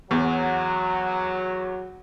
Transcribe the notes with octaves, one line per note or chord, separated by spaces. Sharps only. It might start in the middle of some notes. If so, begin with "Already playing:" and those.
E2 F#3